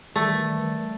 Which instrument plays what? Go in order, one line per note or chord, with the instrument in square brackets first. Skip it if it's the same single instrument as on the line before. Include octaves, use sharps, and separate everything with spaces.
[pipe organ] D#3 E3 G3 [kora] A3